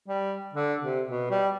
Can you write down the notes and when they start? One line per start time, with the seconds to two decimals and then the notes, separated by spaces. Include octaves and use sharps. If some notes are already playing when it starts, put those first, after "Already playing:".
0.08 G3
0.53 D3
0.82 C3
1.07 B2
1.31 G3